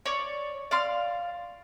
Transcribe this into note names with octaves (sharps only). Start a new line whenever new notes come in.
C#5 D5
D5 F5 C6